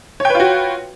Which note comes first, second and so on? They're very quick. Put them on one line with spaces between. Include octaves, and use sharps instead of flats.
C#5 G5 B4 F4 F#4